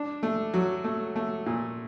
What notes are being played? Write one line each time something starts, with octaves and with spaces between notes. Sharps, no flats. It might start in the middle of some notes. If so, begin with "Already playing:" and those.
Already playing: D4
A3
F#3
A3
A3
A#2